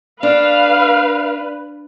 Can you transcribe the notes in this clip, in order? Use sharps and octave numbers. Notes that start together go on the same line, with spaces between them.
D4 B4 F5